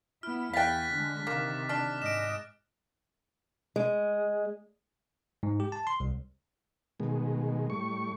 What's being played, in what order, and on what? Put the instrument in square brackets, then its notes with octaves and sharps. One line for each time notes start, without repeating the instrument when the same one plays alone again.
[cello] B3 E4 [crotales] F6
[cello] E2 [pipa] F5 G5 [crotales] F#6 A6 B6
[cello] D3 G#3
[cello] C3 D#3 [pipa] A#3 [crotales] D6
[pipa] D4 [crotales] D6 F6
[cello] G#2 D#5 [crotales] D7 E7
[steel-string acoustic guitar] G#3
[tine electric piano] G#2
G4
A5
C6
C2
[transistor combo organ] B2 D#3 G#3
A2 G3 C#6